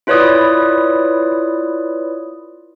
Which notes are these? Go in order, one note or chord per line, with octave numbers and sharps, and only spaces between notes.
E4 F4 B4 C#5 D5 D#6